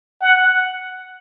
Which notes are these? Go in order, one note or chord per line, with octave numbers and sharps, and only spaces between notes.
F#5